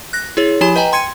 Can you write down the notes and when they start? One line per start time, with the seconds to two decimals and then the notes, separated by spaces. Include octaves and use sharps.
0.13 F#6 A#6
0.37 E4 G#4 C#5
0.61 F3 E4 G4 G#5 B5 E7
0.76 B4 D#5 G5 G#5 A#5
0.92 G5 C6 G#6 C#7 D#7